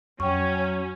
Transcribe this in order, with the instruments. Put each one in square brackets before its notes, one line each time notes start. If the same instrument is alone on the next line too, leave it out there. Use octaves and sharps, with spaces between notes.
[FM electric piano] F2 [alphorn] F#3 [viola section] C#4 [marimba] G5 C#6